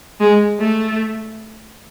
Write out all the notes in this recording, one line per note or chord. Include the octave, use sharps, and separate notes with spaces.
G#3
A3